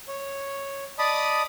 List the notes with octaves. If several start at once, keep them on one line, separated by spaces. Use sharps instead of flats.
C#5
D5 D#5 A5 B5 D#6